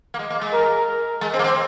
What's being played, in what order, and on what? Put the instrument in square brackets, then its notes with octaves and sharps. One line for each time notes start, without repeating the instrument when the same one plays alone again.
[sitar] A#3
G#3
A#3
G#3
[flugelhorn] A#4
[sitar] G#3
C4
A#3
C4